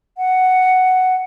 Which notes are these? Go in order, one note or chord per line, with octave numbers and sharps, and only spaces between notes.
F#5